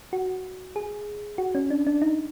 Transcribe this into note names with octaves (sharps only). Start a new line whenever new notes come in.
F#4
G#4
F#4
C#4
D4
D4
D#4